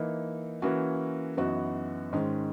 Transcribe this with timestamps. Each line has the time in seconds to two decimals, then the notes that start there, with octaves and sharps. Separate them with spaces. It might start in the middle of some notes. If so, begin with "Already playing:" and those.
Already playing: E3 A#3 D#4
0.62 E3 A#3 C#4 F#4
1.37 F#2 E3 B3 D#4 F#4
2.13 G#2 D#3 G#3 C#4